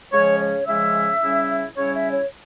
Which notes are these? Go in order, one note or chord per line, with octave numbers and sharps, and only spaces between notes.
C#3 F3 G#3 C#4 C#5
C#5
C#3 F3 G#3 C#4 E5
C#3 G3 C#4 E4
C#3 G3 C#4 E4 C#5
E5
C#5